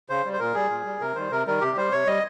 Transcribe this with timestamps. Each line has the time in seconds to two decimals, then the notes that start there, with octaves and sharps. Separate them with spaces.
0.09 C#3 C5
0.25 G3
0.33 C5
0.39 A#2 A#4
0.55 G3 G#4
0.70 A#2
0.85 G3
1.00 C3 A#4
1.16 D#3 G3 C5
1.31 C3 A#4
1.46 D#3 G3 A#4
1.61 C3 G4
1.77 G3 C5
1.92 C3 C#5
2.07 G3 D#5